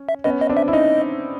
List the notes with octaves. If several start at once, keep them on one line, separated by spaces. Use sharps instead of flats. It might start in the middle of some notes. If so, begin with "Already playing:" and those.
Already playing: C#4
E5
B3 C#4 D#5
D#5
C4 D4
E5
E4
C#4 D#4 D#5